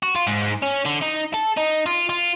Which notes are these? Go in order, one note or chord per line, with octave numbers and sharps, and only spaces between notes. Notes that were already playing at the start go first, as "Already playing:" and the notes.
F#4
F4
G#2
C#4
D3
D#4
A4
D#4
F4
F4